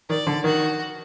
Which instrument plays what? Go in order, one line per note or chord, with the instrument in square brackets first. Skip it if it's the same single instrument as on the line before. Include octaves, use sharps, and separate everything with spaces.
[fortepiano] D#3 [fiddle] D5
[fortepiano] D3
[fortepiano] D#3 [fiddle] F#4